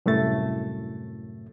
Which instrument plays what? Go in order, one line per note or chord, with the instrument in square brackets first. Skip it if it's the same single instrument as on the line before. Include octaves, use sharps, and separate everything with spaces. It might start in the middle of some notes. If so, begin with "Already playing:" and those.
[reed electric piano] C2 F#2 A2 A3 A6